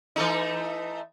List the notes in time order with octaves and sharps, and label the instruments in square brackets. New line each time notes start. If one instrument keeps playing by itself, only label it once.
[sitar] E3 A3 D#4